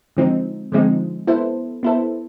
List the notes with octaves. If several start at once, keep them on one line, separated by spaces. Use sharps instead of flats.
D3 F3 G#3 C4 D#4
D3 F3 G#3 C4 D#4
B3 E4 A4 C5
B3 E4 A4 C5